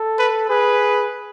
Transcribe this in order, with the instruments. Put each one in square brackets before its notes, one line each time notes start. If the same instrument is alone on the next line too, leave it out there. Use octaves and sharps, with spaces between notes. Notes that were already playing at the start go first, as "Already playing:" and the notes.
Already playing: [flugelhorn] A4
[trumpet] B4
[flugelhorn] G#4 [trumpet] B4